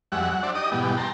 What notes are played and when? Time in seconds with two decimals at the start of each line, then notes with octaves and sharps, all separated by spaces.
0.12 F2 G3 G#3 F#4 E5 F#5
0.30 F#3 F#5
0.43 D4 F#4 C5 D5 E5
0.55 D#4 G4 D5 D#5 D#6
0.72 G#2 B2 E3 G3 B3 G4
0.97 G5 A5 A#5 C6